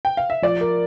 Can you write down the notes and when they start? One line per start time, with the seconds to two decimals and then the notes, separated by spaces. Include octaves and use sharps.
0.05 G5
0.17 F5
0.30 E5
0.42 F3 D5
0.61 A#4